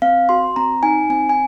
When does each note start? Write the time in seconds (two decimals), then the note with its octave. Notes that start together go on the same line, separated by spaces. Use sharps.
0.02 C4 F5
0.29 F#4 C6
0.56 C4 A#5
0.83 D#4 G#5
1.10 C4 G#5
1.29 G#5